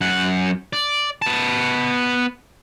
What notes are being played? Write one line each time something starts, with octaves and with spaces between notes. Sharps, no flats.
F#2 F#5
D5
B3 A5